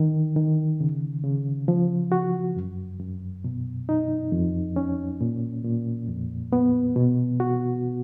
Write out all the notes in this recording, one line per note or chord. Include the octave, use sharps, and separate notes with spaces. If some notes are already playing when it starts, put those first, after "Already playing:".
Already playing: D#3
D#3
C#3
C#3
F3
F#4
F#2
F#2
B2
D#4
F2
C#4
A#2
A#2
F2
B3
B2
F#4